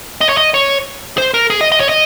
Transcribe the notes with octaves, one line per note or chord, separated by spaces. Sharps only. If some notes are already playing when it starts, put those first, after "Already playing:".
D#5
C#5
D#5
C#5
C5
A#4
G#4
D#5
D#5
C#5
D#5